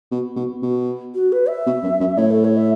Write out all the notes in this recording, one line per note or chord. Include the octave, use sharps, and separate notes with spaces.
B2
B2
B2
F#4
B4
E5
B2
F#2
F#2
A2 C#5
A4
C#5
E5